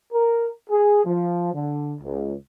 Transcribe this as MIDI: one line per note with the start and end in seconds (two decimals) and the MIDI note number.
0.12 0.51 70
0.70 1.05 68
1.05 1.50 53
1.53 1.95 50
2.02 2.34 37